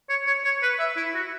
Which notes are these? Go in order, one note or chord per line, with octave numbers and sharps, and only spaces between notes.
C#5
C#5
C#5
B4
E5
E4
F#4